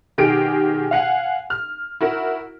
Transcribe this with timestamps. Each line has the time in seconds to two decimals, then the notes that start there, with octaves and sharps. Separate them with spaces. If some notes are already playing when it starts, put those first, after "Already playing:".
0.18 B2 D#3 G4 G#4 D7
0.91 F5 F#5 G#5
1.50 F6
2.01 E4 F#4 A#4